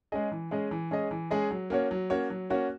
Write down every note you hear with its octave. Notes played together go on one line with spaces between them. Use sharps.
G#3 C#4 G#4 D#5
E3
G#3 C#4 G#4 D#5
E3
G#3 C#4 G#4 D#5
E3
G#3 C#4 G#4 D#5
F#3
A#3 C#4 F#4 C#5
F#3
A#3 C#4 F#4 C#5
F#3
A#3 C#4 F#4 C#5